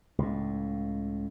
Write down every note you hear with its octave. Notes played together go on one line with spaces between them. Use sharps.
C#2 A2